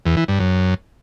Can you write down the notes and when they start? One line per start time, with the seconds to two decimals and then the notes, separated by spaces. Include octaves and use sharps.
0.06 E2
0.17 E3
0.28 G2
0.40 F#2